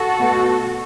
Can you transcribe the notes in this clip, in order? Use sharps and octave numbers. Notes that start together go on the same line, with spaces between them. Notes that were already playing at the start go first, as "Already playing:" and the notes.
Already playing: F#4 A4
B2 A3